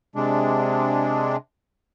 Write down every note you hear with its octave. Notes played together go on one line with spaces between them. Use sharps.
C3 G#3 D4